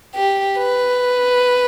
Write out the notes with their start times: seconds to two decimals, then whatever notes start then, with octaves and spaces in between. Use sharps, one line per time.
0.16 G4
0.59 B4